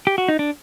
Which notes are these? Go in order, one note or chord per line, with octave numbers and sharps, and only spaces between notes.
G4
F#4
D#4
D4